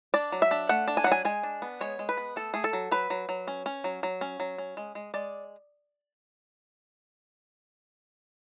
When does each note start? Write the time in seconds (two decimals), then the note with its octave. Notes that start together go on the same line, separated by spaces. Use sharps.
0.14 D4 D5
0.32 F#3
0.42 E5
0.51 D4
0.69 A3 F#5
0.88 D4
0.97 G#5
1.04 F#3 F#5
1.12 G#5
1.25 G#3 G#5
1.43 D4
1.62 B3
1.81 G#3 C#5
1.99 G#3
2.09 B4
2.17 B3
2.36 A3 A4
2.54 A3 G#4
2.64 A4
2.73 F#3
2.91 F#3 B4
3.10 F#3
3.29 F#3
3.47 C#4
3.66 C#4
3.84 F#3
4.03 F#3
4.21 C#4
4.40 F#3
4.58 C#4
4.77 G#3
4.95 G#3
5.14 G#3 D5